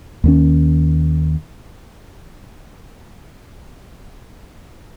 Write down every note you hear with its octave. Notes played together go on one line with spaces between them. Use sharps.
D#2 D#3 F#3 C#4